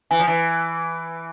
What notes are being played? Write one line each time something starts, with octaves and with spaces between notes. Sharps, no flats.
E3 G#5
F3
E3